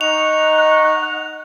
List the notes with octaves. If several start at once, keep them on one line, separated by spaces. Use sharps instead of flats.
D#4 D#5 F#5 A#5 C#6 F7